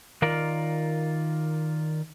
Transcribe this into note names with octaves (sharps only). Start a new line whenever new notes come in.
D#3 F4 A#4 D5